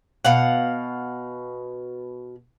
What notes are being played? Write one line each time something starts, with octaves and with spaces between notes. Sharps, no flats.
B2 F5 F#5